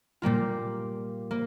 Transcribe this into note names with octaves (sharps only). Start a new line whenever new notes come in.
A#2 G3 A#3 F4
A#3